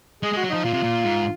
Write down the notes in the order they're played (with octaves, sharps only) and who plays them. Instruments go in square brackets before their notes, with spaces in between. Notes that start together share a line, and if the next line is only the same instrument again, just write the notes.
[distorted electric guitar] G#3 [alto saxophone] G#4
[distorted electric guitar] G#3 [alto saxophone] F#4
[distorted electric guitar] F#3
[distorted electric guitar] F3 [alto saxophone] D#4
[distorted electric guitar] A#2 [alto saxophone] F4
[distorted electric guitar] C3
A#2
G#2